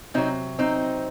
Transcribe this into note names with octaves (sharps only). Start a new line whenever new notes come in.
C3 F#3 C4 D#4
C4 D#4